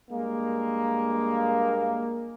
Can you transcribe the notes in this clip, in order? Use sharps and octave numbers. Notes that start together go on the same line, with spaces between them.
G2 G#3 A#3